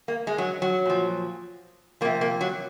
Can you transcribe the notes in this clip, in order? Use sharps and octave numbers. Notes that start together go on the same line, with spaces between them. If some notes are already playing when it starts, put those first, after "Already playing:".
A#3
G#3
F#3
F#3
A#2 F3
C3 F3 A#3
A#3
F#3